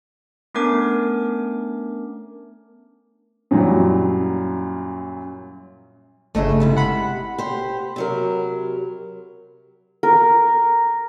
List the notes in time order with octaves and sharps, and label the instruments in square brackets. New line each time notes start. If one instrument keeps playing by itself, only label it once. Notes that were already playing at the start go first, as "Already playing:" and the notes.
[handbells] A3 B3 C#4 D4 A#4 D6
[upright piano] F#2 A#2 E3 F#3 G3
[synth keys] G1 C#3 [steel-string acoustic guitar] A3 D#5 E5
[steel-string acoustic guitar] G#2 C3 E4
[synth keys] F#5 B5
[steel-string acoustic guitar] G4 C5
C3 F#3 A#4
[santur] A#4